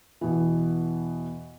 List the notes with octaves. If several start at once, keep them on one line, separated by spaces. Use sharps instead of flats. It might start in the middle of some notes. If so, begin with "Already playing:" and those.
E2 B2 E3